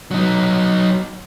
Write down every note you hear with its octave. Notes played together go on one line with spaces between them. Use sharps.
F#3 D#4